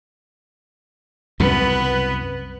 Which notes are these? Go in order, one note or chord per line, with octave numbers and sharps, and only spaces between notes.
C2 F#2 C#3 B3 B4